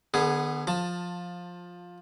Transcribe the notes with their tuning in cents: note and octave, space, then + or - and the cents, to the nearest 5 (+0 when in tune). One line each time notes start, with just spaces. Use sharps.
D3 +45 B3 +0 G#4 +0
F3 +15 A5 +15